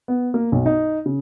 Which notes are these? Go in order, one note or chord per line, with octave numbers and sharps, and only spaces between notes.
B3
A#3
B1
D#4
C#3